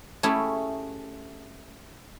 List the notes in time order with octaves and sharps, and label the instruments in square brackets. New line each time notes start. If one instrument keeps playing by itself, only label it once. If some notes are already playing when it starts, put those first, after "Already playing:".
[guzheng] A3 C#4 E4 G4 G#4